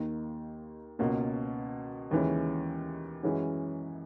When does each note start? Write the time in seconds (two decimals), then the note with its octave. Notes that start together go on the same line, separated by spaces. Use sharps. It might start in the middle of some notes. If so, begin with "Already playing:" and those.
Already playing: D#2 D#3 A#3
0.99 C#2 B2 A#3 C#4
2.11 D#2 C#3 E3 G#3 C#4
3.23 F#2 E3 G#3 C#4 F#4